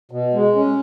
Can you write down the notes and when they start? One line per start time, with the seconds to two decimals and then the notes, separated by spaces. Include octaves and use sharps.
0.11 B2
0.34 G#3
0.56 C#4